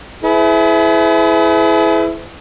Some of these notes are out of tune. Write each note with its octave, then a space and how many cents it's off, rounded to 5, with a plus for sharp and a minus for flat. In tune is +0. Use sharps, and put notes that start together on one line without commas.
E4 +0 G#4 +45 B4 +40